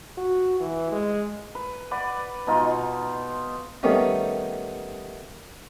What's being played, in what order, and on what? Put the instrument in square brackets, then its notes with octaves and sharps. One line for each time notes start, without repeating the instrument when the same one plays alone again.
[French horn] F#4
E3
G#3
[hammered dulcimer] B4
B4 D5 F#5 B5
B2 D#4 F4 C6
[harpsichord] D#3 G3 A3 B3 C#4 D#4